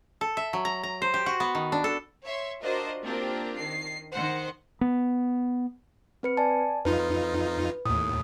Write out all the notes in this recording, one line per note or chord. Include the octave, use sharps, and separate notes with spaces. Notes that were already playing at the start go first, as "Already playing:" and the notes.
A4
E5
F#3
A#5
A#5
C5
G4
F#4
B3
D#3
D4
A4
C#5 E5 C6
D4 F4 F#4 A#4 C5 D#5
A#3 C4 D4 F4 G4 A#4
D#3 C7
D#3 C5 F#5
B3
C4 B4 C#7
D5 G#5 A5
F2 D#4 F4 B4
D#2 A2 D#6